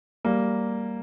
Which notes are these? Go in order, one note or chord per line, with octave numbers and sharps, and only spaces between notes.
G3 A#3